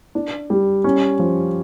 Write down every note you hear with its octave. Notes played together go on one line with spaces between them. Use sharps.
D4
G3
C#4
F3